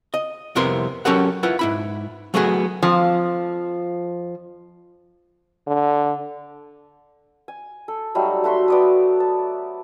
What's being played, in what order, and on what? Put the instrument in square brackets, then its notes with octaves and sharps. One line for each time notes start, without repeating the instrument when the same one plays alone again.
[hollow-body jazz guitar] D#5
C2 F2 C3 B3 A#4 C6
F#3 C#4 G4 A4 A#4 F#5
E4 F4 B4 F#5
G#2 E4 B5
F#3 A3 B3 F#4 G#4
[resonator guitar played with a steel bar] F2 F3
[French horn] D3
[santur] G#5
A4
F#3 G3 A3 D#4
A3 F#4 B5 C6
B3 D5 D#6
A5